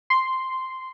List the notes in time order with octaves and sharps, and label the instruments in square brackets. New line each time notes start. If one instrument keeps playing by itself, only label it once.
[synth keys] C6